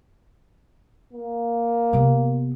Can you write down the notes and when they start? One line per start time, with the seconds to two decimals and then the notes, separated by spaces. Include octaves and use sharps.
1.13 A#3
1.93 C3 B3